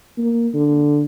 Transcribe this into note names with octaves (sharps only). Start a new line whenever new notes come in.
A#3
D3